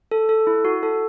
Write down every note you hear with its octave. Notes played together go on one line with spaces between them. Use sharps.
A4
A4
E4
F#4
A4